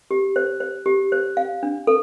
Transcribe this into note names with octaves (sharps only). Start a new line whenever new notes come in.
G4
C5
C5
G4
C5
F5
D4
A4